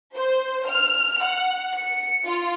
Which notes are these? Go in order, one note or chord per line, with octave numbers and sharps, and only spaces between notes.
C5
F6
F#5
C#7
F4